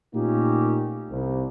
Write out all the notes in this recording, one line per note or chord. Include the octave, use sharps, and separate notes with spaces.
A#2 A3 A#3 C#4 D#4 G4
C2